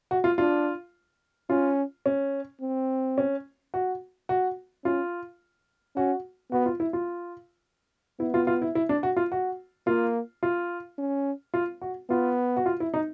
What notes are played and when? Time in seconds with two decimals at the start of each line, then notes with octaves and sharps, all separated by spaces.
0.11 F#4
0.24 F4
0.38 D4 F4
1.50 C#4 F4
2.06 C#4
2.61 C4
3.18 C#4
3.74 F#4
4.29 F#4
4.85 C#4 F4
5.96 C#4 F#4
6.52 B3 F#4
6.66 F4
6.80 E4
6.93 F4
8.20 B3 E4
8.34 F4
8.47 F4
8.62 E4
8.75 E4
8.89 D4
9.03 F#4
9.17 F4
9.32 F#4
9.87 A#3 F4
10.43 F4
10.98 C#4
11.54 F4
11.82 F#4
12.10 B3 F4
12.57 F#4
12.66 F4
12.80 E4
12.94 D#4